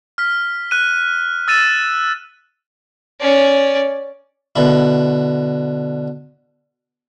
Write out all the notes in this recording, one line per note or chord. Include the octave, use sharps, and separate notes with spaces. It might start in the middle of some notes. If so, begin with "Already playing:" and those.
F6 B6
F#6 D#7
E6 A6 D#7 E7
C#4 D5
B2 D3 E4